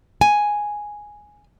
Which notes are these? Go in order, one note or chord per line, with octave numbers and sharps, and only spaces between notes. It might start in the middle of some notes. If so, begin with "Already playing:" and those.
G#5